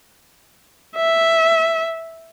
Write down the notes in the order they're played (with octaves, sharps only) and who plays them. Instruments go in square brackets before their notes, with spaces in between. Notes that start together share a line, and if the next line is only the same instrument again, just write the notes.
[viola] E5